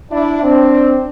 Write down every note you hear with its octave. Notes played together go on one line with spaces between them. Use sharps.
D4 E4
C4 D4